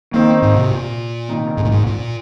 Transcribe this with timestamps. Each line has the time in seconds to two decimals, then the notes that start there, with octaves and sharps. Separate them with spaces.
0.14 D#3 A#3 C4 D#4
0.42 G#2
0.56 C3
0.71 A#2
1.28 C3 D#3 A#3 D#4
1.57 G#2
1.65 A#2
1.72 G#2
1.87 A#2